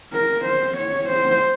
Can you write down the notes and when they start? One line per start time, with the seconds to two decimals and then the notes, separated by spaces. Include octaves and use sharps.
0.13 A#4
0.45 C5
0.77 C#5
1.09 C5